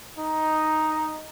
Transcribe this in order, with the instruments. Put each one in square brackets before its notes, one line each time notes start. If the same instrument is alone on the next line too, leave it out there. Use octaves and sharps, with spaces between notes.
[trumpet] D#4